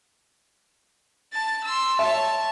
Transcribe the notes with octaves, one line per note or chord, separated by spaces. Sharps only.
A5 A6
C6 E6
C#5 E5 A5